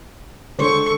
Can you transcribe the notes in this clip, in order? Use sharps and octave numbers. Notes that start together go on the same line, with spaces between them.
D3 G#3 D4 A4 C5 C#5 C#6